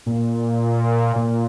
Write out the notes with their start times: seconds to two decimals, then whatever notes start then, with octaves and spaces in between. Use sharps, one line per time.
0.06 A#2
1.16 A#2